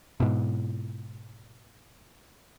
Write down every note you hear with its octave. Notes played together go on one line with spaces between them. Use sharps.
G#2 B2